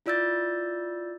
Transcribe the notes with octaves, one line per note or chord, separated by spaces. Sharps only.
E4 F4 D5 E6 G6 A6